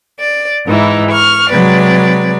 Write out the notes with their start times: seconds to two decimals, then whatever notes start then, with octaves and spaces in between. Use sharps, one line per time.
0.19 D5
0.66 G#2 E3 D#4 E4
1.10 C#6 F6
1.51 C3 F#3 G#3 B4 D5